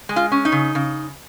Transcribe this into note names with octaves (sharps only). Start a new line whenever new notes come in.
G#3
F4
C#4
D#4
C#3
C#3